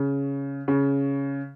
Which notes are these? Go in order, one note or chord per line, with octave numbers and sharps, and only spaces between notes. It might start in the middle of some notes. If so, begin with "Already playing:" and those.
Already playing: C#3
C#3